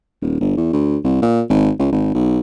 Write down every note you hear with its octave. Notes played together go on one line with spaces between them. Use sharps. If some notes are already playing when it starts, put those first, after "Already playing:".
D#1
G1
E2
D2
C2
A#2
G#1
C#2
G#1
B1